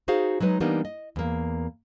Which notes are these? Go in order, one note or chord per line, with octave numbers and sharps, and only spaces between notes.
D#4 F#4 G#4 C5 F5
F#3 G#3 D#4 B4
E3 G3 A#3 B3 D4 D#4
D#5
E2 A#3